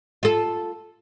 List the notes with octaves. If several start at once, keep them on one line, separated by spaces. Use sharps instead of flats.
F4 A4